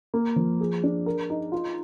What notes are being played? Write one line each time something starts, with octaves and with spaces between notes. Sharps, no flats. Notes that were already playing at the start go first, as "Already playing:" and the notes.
A#3
F3
G#4
D4
A#4
D#4
F4